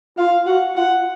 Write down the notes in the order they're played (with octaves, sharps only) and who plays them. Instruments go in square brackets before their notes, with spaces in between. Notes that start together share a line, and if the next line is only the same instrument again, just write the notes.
[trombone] F4 [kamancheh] F5
[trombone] F#4 [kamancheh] F#5
[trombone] F4 [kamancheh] F#5